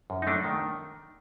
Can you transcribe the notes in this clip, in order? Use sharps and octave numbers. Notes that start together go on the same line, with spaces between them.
F#2
D#4
A3 D4
D#3